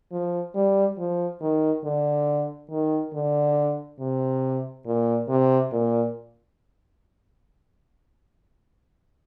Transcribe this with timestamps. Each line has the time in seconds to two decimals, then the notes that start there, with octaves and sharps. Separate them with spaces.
0.12 F3
0.55 G3
0.98 F3
1.41 D#3
1.84 D3
2.71 D#3
3.14 D3
4.00 C3
4.86 A#2
5.28 C3
5.72 A#2